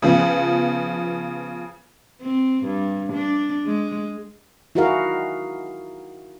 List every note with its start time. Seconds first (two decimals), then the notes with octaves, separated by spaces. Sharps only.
0.02 C#3 F3 B3
2.22 C4
2.65 G2
3.14 D4
3.66 G#3
4.75 D#4 E4 F#4 G#4 A#4 F5